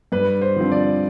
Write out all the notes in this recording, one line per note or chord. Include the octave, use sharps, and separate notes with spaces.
G2 B4
C5
D3 F3 C4
D5